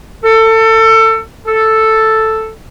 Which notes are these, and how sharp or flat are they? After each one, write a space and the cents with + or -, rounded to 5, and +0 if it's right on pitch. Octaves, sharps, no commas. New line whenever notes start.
A4 +25
A4 +0